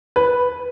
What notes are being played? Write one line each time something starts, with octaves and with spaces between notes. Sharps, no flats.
B4